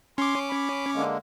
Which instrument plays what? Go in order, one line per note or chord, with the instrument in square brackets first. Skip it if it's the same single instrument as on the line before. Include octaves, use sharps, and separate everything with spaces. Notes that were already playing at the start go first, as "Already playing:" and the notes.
[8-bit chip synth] C#4 D6 [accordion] C6
[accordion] B5
D3 G#3 A#3